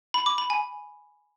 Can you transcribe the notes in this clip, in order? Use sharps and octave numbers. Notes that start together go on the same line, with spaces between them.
B5
D6
B5
G#5